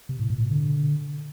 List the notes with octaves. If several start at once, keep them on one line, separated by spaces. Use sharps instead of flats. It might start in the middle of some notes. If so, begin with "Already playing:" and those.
C3
A2
A#2
B2
D3